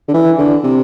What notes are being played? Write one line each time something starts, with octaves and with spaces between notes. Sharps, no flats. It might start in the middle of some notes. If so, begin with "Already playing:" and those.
D3
E3
D3
C3